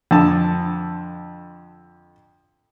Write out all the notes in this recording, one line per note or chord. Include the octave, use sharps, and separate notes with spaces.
F2 D3 A5